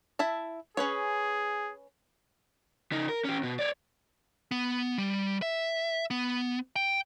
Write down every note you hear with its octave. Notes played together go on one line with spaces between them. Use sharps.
E4 E5 A5
C#4 G#4 B4 C#5
C#3 D#4
A#4
C#4 G4
B2
C#5 D5
B3
G3
E5
B3
G5